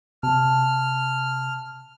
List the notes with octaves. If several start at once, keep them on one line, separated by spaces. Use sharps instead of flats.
C3 A5 F6